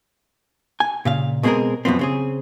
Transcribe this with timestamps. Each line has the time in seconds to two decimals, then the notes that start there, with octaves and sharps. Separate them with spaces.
0.80 G#5
1.05 A#2 C#3 F5
1.43 B2 G#3 C4 C#4 G#4 A#4
1.85 F#2 B2 F3 B3 C4
1.99 C#3 C4 G#4